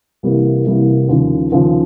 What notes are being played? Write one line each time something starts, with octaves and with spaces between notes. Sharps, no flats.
C2 C3 E3 G3 A#3
C2 C3 E3 G3 A#3
D#2 C#3 F3
D#2 C#3 F3